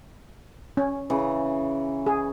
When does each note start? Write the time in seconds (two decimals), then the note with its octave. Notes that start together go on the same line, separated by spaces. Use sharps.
0.77 C#4
1.10 C#3 E3 A#5
2.06 G#4